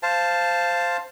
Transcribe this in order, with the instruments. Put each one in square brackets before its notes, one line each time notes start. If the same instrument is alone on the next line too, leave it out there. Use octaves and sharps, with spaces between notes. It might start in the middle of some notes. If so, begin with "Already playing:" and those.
[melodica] C5 F5 A5